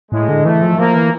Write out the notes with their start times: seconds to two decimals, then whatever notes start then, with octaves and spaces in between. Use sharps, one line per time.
0.12 A2 G#3
0.29 D3
0.45 E3 A3
0.62 F3
0.79 F3 A#3
0.95 E3